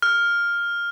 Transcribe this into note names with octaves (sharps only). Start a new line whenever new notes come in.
F6